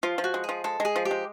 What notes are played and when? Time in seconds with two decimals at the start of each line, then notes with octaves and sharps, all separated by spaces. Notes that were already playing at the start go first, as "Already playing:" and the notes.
0.03 F3 F4
0.18 F3
0.24 F#4
0.34 G#3
0.44 F3 G#4
0.64 G#3 A4
0.80 G#3 G#4
0.96 F3
1.05 G4
1.11 G#3